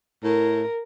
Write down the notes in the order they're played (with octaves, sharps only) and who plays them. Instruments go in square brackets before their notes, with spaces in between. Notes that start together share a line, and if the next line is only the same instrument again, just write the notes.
[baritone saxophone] A2 [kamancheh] A#4